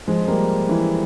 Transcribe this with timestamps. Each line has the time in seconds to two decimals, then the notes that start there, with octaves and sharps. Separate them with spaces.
0.07 F3 G#3
0.28 G3 A#3
0.69 E3